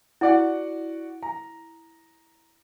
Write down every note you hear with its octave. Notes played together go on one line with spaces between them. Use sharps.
E4 F#4 D5 F#5
A#5